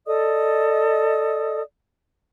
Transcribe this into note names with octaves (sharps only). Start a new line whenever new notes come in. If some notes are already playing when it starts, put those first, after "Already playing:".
A4 D5 D#5 D#6